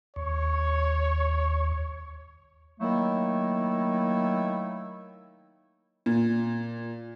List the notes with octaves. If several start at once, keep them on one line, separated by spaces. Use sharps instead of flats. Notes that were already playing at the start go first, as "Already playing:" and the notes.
D#2 C#5 C#6
D#3 F#3 A3 A#3 E4
A#2